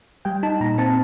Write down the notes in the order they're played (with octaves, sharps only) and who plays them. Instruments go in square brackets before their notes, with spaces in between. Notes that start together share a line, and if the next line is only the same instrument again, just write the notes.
[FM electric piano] G3 G5
D#4 A5
A#2 A#5
C4 A5